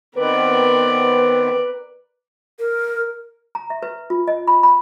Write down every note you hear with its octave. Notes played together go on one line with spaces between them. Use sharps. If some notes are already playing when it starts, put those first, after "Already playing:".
D#3 B3 C4 A#4 B4 D5
A#4
A#5
E5
B4
F4
D#5
B5
B5